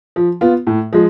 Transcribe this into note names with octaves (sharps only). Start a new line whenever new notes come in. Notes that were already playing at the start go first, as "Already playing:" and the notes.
F3
B3 F4
A2
F3 G#3